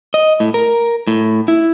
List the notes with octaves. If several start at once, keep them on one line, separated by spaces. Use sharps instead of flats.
D#5
A2
A#4
A2
E4